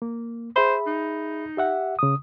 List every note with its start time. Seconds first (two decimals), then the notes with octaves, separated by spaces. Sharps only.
0.02 A#3
0.56 G#4 C5 E5 B5
0.87 D#4
1.57 G4 E5 F#5
1.99 C#3 D#6